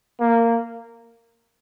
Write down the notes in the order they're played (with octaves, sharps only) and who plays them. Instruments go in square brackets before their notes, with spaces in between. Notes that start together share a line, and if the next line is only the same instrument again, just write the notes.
[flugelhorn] A#3